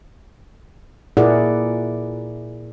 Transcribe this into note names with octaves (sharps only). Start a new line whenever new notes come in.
A#2 E4 G#4 A#4 D5 F#5